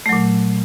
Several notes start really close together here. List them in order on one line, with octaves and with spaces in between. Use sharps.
A3 F#3 A#2